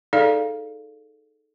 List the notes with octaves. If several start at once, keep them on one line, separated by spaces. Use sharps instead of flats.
D#4 G#4 A4 D5 F5